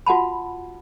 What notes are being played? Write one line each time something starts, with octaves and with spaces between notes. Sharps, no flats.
F4 F#4 F#5 A5 B5